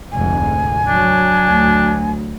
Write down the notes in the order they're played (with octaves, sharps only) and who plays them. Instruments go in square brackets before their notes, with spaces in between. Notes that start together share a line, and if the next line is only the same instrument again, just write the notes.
[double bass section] F1 D2 G#2 [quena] G#5
[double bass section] F#3 [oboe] D4
[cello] D2